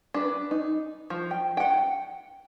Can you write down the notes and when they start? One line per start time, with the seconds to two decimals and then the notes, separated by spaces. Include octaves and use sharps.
0.14 D4 B4
0.51 D#4
1.10 F3
1.31 G5
1.57 F#5 G5